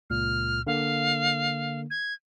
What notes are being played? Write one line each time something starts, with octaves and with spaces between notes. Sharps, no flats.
C#2 A#2 F6
D3 A#3 F5
G#6